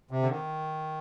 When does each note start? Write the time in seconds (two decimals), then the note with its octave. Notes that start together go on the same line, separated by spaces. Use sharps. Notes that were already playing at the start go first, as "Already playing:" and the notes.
0.11 C3
0.22 D3
0.30 D#3